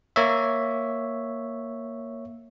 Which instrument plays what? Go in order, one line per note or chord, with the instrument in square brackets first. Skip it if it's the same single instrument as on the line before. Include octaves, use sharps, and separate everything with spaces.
[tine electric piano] A#3 C#5 E5